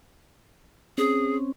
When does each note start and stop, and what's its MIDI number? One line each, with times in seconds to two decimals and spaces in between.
0.98 1.52 60
0.98 1.52 61
0.98 1.36 68